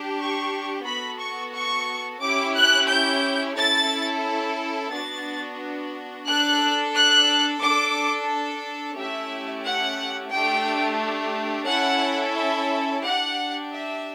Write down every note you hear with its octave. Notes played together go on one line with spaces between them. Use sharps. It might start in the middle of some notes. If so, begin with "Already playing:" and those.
Already playing: D4 G4
C#6
B3 F#4 A4 B5
C#6
C#6
C#4 E4 G4 D6
F#6
G6
C#4 E4 A4 A6
B3 D4 F#4 A6
D4 A4 F#6
F#6
D4 A4 D6
A3 C#4 E4 G4 E5
F#5
A3 D4 G4 G5
C#4 E4 A4 F#5
E5
D4 G4 F#5
E5